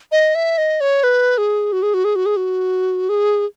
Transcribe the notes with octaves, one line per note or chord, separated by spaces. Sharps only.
D#5
E5
D#5
C#5
B4
G#4
F#4
G#4
F#4
G#4
F#4
G#4
F#4
G#4